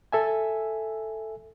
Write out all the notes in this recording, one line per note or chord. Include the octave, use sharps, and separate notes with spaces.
A4 E5 G#5